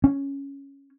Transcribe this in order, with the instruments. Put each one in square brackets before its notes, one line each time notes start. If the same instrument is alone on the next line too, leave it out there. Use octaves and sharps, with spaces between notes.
[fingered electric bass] C#4